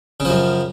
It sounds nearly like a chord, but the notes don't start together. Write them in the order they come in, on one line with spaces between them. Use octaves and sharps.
C#3 F3 F#2